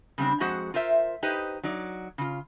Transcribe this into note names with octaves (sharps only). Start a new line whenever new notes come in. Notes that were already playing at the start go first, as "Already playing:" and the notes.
C#3 G3 C4 D4
F2 G#3 F#4 G#4 C5 F#5
F4 A#4 C5 E5
D#4 G4 B4 C5 D#5
F#3 D#4 D5
C#3 F4